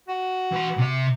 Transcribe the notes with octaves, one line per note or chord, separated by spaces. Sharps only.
F#4
E3 C6
C3 E5